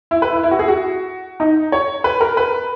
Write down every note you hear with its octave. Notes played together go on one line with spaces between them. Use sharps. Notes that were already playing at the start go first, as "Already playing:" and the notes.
E4
B4
E4
E4
F#4
G#4
F#4
D#4
C#5
B4
A#4
B4